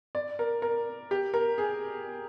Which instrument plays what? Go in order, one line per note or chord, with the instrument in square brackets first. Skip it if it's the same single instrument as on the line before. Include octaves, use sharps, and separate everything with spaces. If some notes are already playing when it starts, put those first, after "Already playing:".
[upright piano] D5
A#4
A#4
G4
A#4
G#4